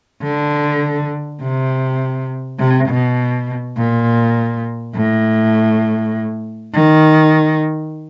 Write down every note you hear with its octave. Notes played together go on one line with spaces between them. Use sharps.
D3
C3
C3
B2
A#2
A2
D#3